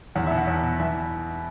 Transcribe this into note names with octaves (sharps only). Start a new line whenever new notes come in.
E2 F#5
B2 E5
F#5
E2
B2
E3 E5